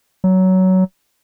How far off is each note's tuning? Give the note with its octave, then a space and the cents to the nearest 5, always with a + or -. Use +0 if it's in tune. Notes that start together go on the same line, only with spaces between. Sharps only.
F#3 +15